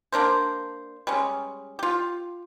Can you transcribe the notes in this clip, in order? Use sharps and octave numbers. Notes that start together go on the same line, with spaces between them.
A#3 D4 A#4 C5
G3 G#3 C#4
F4 G4